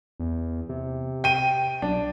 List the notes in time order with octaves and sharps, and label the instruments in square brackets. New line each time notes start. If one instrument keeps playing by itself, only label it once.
[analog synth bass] E2
C3
[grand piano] G5 D#7
[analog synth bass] B1 [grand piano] D4